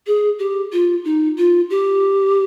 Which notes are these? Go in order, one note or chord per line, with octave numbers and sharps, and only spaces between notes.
G#4
G4
F4
D#4
F4
G4